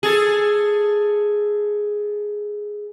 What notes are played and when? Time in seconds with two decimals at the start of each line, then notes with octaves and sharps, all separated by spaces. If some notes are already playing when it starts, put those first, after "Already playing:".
0.03 G#4 A4